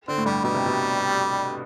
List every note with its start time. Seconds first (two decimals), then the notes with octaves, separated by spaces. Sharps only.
0.08 D3 C4
0.18 A2
0.26 G2 G3
0.44 B2 G3
0.54 C3
0.66 B2